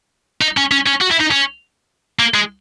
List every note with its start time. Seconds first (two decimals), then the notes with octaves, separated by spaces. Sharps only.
0.41 D#4
0.57 C#4
0.71 C#4
0.86 C#4
1.01 F#4
1.11 E4
1.20 D#4
1.31 C#4
2.20 A#3
2.34 G#3